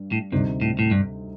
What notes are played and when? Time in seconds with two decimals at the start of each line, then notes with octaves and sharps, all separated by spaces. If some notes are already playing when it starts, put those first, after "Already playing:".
Already playing: G2 G3
0.12 A2
0.32 D2 G2 C3 G3 C4 D#4
0.61 A2
0.79 A2
0.91 G2